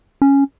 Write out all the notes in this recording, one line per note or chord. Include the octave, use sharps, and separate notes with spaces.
C#4